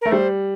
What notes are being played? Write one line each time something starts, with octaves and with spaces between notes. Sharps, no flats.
A3 A#4
G3 C5